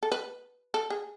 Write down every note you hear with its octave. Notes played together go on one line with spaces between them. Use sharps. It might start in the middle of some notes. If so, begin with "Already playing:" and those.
A4
B4
A4
G#4